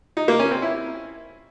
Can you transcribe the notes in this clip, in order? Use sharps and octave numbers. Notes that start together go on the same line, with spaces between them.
D#4
A#3
C#4
C4
E4